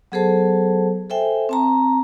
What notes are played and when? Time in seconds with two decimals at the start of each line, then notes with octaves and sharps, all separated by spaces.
0.12 F#3 B3 G#4 A4 C5 A5
1.10 A4 C5 E5 G5 G#5
1.49 C4 A5 A#5